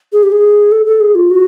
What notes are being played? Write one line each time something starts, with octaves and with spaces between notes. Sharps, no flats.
G#4
G4
G#4
A4
A4
G#4
F4
F#4